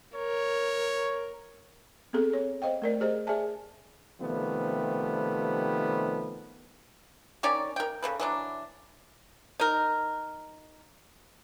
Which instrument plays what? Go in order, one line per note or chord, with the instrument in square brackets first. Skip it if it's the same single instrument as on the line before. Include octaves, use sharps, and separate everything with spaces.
[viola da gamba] A#4 [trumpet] C#5
[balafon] B3 C4 G#4 A4
C#5
C5 D#5 F5 G5
A3 A#4 D5
G4 G#4 C5 D#5
G#4 D5 E5 G#5 A5
[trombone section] C3 D#3 F3 G3 A3 B3
[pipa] D#3 C#4 C#5 D5
A#4 G5
C#3 A4 B4
E3 F#3 D4
D#4 A#4